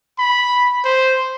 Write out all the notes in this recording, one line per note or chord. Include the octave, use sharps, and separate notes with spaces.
B5
C5